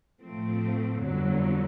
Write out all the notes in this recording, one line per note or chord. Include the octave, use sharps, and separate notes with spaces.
A2 F3 A3 C4
G1 F2 D3 F#3